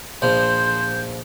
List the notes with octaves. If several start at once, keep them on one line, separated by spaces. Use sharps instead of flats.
A#1 F3 C5 G6